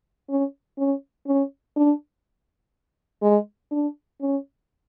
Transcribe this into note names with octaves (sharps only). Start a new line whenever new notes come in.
C#4
C#4
C#4
D4
G#3
D4
C#4